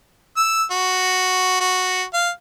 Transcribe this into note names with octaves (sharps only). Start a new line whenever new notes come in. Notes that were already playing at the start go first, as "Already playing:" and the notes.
E6
F#4
F#4
F5